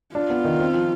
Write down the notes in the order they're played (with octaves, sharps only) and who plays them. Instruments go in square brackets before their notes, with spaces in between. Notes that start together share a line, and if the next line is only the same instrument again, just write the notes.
[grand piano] D4 [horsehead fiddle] F4
[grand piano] B3
D#3
C4
F3